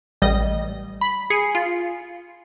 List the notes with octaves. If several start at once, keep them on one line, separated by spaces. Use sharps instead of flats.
A1 G3 D#5 A#6
B5
G#4 C7 C#7
F4